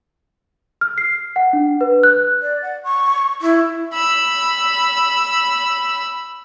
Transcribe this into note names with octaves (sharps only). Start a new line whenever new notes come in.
F6
C7
F#5
D4
B4
F#6
D5
F#5
C#6
E4
B5 E6